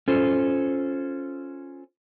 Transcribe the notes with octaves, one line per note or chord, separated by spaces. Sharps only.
C#4 F4 A4 C5